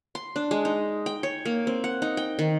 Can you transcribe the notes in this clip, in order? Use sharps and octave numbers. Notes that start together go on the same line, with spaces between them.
C6
D4
G#3
D#4
G5
C#5
A#3
C4
F#5
D#4
G5
D#3